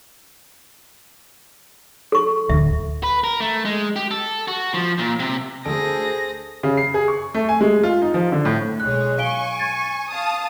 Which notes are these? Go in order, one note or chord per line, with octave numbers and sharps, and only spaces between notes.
A4 C#6
D1 D2 E5
B4
A#4
A3
G#3
G4
A4
F#4
F3
A#2
C3
D2 G#4 A4 C5 A#6 D7
C#3
C7
G#4
C#6
A3
G#5
G#3
F4
D#4
F3
D3
A2
B1 G#3 C#5 F#6
F5 G#5 C#6 D7 G7
G#6 A6 D#7
F5 A5 D#6